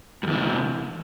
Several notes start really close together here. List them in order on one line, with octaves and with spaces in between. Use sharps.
G2 E2 E3 C3